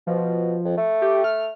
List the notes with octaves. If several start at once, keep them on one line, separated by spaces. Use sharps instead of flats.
B2 F3
F2
A3
G4
F6